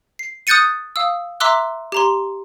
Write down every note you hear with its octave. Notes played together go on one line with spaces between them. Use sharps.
C7
D#6 F#6 G6 A6 C#7 D#7
F5 D#6 E6
E5 A#5 C6 D6 E6 F#6
G4 A#5 C6